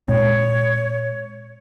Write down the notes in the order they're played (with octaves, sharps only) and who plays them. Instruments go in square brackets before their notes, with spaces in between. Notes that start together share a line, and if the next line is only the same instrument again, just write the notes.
[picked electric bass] A#2 G#3 C4 [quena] C#5